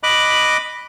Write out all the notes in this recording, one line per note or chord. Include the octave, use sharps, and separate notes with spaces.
D#5 B5 D6 F#6